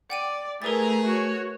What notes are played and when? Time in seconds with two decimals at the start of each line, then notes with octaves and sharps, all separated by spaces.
0.10 D5 F#5 G5 D#7
0.62 A3 E4 G#4 A#4 B4 A#5 A6
1.05 F#4 C#5